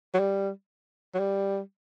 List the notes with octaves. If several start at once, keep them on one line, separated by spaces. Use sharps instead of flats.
F#3
G3
F#3
G3